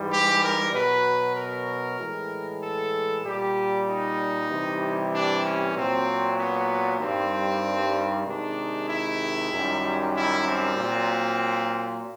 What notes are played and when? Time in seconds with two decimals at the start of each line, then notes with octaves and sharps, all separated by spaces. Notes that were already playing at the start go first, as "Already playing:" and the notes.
Already playing: G#2 E3 G3
0.10 G4
0.42 A#4
0.72 B2 F#3 B4
1.35 A#4
1.98 A2 E3 G#3
2.61 A4
3.24 A#2 G3 G4
3.86 D#4
4.49 C3 E3 G3
5.11 D4
5.43 C#4
5.74 A#2 F#3 C4
6.37 B3
6.99 G2 D#3 G3 C4
8.25 C3 D#3 G#3 D4
8.88 E4
9.51 F#2 D#3 G3
10.14 E4
10.45 C4
10.77 A#2 F#3